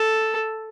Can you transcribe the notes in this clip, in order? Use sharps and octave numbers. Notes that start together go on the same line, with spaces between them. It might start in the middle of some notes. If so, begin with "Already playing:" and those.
Already playing: A4